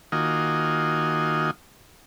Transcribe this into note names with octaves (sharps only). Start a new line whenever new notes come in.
D#3 A#3 F4 F#4 D#5 G#5